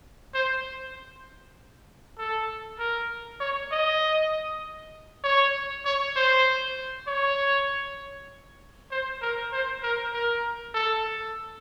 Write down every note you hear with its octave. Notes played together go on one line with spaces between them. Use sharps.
C5
A4
A#4
C#5
D#5
C#5
C#5
C5
C#5
C5
A#4
C5
A#4
A#4
A4